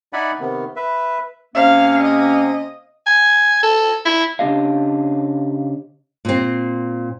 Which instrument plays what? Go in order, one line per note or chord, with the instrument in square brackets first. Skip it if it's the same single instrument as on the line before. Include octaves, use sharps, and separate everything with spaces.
[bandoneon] D#4 D5 E5 F#5 G#5 B5
C3 D#3 B3
B4 E5
[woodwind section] C3 A#3 C#4 [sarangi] F5
[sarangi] D#5
[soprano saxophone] G#5
A4
E4
[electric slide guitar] C#3 D4 G4 D#5 F5
[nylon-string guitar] A#2 C4